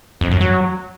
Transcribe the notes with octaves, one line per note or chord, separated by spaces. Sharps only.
F2
F#2
F#3